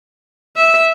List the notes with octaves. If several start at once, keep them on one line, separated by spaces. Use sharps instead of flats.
E5